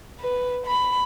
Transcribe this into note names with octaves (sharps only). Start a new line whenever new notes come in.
B4
B5